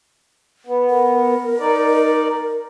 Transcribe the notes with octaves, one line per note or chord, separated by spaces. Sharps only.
B3
A#4
D#4 D5